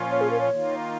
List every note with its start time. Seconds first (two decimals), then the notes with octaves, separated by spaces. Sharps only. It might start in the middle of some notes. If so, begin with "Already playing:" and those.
Already playing: A#2 F3 C#4 F4
0.11 C#5
0.21 G#4
0.30 A#4
0.40 C#5
0.50 D#3 A#3 F4